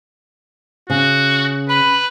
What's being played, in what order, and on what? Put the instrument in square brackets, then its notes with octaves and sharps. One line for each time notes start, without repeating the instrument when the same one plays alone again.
[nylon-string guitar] C#3 [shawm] F#4
[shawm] B4 [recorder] B5